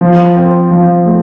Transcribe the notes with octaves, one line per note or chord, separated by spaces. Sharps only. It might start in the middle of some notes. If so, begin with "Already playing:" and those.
F3
C4
F3
A3